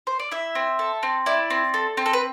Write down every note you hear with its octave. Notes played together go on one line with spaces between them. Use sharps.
C5
D5
E4 E5
C4
A4
C4
E4 D5
C4
A4
C4
A4
B4